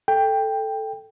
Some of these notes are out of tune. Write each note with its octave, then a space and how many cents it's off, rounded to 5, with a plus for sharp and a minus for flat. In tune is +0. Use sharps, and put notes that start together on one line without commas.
A4 +0 G5 +10